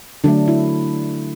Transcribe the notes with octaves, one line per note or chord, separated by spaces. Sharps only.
D3 F#3 A3 D4
E4